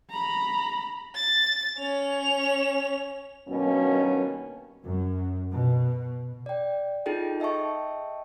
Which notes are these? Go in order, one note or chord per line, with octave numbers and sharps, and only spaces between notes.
A#5 B5
A6
C#4 F7
G2 B2 D#3 F#3 A#3 C#4
F#2
B2
D5 G5
D#4 F4 G#4 A4 G5
D#5 E5 G5 A5 C#6